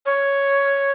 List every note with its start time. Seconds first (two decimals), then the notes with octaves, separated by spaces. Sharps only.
0.06 C#5